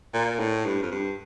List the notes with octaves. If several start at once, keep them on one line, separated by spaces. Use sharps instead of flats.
A#2
A2
G2
F2
G2